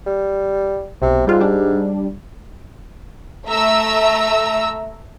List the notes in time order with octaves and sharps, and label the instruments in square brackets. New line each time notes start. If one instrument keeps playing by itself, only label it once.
[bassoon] G3
[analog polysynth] B1 [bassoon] C3
[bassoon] G#2 [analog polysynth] G3 F4
[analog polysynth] G3 D4
[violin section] A3 E5 A#5 E6